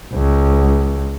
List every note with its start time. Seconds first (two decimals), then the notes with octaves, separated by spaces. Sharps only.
0.13 C#2